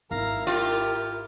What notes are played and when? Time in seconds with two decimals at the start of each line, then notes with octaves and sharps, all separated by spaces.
0.11 G#1 E4 A#4 F5 A#5
0.47 F4 G4 D6